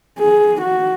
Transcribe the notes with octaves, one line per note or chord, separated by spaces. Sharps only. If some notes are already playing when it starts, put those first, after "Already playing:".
G#4
F#4